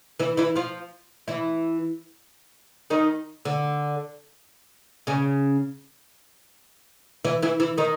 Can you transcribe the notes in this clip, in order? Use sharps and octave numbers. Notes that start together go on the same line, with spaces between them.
E3 E4
E3 E4
F3 F4
E3 E4
D#3 D#4
D3 D4
C#3 C#4
E3 E4
E3 E4
E3 E4
D#3 D#4